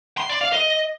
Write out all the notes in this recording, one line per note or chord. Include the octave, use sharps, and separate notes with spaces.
C6
D5
F5
D#5